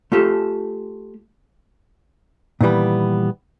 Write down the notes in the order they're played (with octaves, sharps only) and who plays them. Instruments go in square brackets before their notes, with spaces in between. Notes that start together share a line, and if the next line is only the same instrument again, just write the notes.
[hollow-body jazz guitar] A3 F4 G4 A4
A#2 D#3 E3 G3 B3